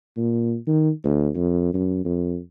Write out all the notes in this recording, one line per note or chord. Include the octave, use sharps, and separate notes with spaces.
A#2
D#3
D2
F2
F#2
F2